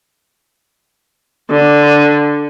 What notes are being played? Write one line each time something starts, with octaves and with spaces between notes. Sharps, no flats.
D3